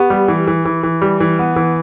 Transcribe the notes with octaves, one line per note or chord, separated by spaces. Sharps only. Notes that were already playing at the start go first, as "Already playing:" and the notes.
Already playing: B3 G4
G3
E3
E3
E3
E3
G3
E3
B3
E3